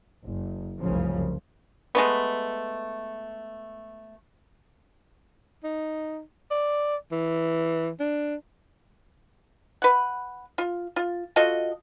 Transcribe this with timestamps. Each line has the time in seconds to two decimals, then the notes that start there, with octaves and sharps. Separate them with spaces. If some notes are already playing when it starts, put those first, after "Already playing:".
0.23 F#1
0.80 F1 C2 F#2 C#3 F3
1.95 G#3 A3 B3
5.64 D#4
6.51 D5
7.12 E3
8.00 D4
9.82 B4 F#5
10.58 F4
10.96 F4
11.36 F4 F#4 A4 D#5